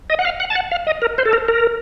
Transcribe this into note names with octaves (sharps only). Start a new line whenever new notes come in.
D#5
F#5
F5
F#5
A5
F#5
F5
D#5
A#4
C5
A4
A#4
A#4